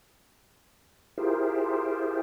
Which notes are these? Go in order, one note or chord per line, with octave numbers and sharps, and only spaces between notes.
E4 F4 G4 G#4 A#4 C5